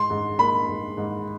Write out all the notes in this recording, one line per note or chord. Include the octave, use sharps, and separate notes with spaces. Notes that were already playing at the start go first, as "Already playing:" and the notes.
Already playing: G#2 C6
G#2
A#3 B5
G#2
G#2